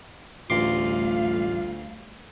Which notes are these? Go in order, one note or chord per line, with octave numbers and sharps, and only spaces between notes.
A1 D2 G3 A3 F4 F5 C6 D6